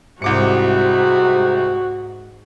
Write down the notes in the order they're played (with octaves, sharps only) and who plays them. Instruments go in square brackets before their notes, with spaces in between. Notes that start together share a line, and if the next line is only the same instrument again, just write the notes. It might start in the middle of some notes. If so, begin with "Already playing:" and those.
[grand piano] C2 D6 C#7 [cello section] G#2 [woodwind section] C3 [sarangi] F#4